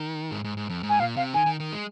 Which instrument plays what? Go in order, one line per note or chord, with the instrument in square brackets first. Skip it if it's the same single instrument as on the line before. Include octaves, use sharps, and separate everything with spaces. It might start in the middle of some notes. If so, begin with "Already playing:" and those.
Already playing: [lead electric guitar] D#3
G#2
G#2
G#2
F2
G#2
[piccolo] G#5
[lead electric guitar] A#2 [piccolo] F5
[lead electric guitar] C3 [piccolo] F5
[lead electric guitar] D#3 [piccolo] G#5
[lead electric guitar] D#3
D#3
G#3